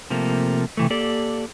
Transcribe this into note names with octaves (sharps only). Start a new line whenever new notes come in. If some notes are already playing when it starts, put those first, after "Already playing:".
C3 F3 A3 A#3
C3 E3 A3
A#3 G4 A4 D5